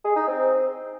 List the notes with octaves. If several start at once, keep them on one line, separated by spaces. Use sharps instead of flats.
G#4
D#4
C4